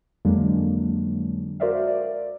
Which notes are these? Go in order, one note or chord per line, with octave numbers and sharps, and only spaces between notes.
F2 D3 F#3 G#3 A#3 D4
F#4 A#4 C5 D5 E5 F5
D5